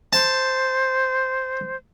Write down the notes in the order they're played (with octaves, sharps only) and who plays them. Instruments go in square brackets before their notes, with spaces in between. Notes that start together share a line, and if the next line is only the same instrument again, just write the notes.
[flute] C5 [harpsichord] A5